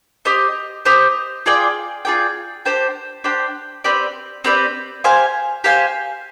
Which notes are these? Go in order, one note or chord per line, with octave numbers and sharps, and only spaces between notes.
G4 C5 D#5
G4 C5 D#5
F4 G#4 D5 G5
F4 G#4 D5 G5
D4 G4 C5 G5
D4 G4 C5 G5
C4 G4 B4 D5
C4 G4 B4 D5
G4 C5 F5 G#5
G4 C5 F5 G#5